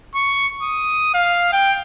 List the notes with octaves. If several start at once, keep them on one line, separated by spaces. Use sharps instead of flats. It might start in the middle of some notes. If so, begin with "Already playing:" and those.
C#6
D#6
F5
G5